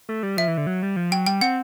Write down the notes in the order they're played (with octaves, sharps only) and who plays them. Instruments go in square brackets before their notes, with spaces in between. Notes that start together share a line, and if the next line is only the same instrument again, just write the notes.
[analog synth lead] A3
G3
[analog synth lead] F3 [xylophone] E5
[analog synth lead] E3
D3
F#3
G3
F3
[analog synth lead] F#3 [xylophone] G5
[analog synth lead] G3 [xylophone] G5
[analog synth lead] C4 [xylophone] F#5